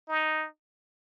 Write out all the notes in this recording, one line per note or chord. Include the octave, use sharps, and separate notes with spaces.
D#4